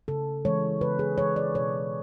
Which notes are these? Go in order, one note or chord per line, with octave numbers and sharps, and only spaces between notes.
C#3 A4
E3 G#3 C#5
C#3 B4
G#4
E3 G#3 C#5
D5
B2 C#5